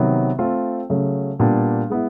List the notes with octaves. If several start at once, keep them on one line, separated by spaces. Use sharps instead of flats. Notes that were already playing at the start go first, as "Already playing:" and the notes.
Already playing: C3 D#3 F#3 B3
A3 C4 F4 A4
C#3 F#3 A3
A#2 G3 B3 D4 G4
G#3 B3 E4